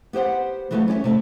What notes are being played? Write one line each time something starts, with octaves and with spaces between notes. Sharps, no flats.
B3 G4 C5 F#5
E3 F#3 G3 A3 B3 F4
C#4 D5 E5
C3 A3 A4